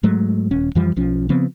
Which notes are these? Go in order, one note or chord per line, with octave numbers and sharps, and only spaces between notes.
G#2 F#3 G#3 A3
D#1 C#4
F2 E3 F3 G3
B1 F3 C#4
C#3 F3 B3 C4